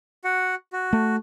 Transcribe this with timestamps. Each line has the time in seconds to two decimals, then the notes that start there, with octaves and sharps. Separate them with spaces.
0.24 F#4 F#5
0.73 F#4
0.93 A3